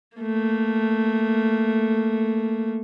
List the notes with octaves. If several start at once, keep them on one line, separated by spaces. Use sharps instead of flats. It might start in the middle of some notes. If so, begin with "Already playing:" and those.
A3 A#3